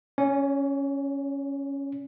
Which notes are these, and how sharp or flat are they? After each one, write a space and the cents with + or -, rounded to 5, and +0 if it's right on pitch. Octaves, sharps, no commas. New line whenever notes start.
C#4 +0 C#5 +45